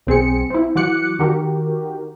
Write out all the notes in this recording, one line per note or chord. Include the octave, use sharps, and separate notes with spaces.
B1 C4 G#4 C#7
C4 E4
E3 F#3 F#4 D6 F#6 C#7
D#3 F#4 G4 A#4